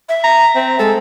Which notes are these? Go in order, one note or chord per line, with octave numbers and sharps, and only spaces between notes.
E5
A#5
C4
G#3 A4